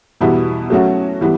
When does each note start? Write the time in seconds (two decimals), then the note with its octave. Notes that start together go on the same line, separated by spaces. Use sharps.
0.21 E2 B2 G3 B3 E4
0.70 F#3 A3 C#4 F#4
1.21 E3 G3 B3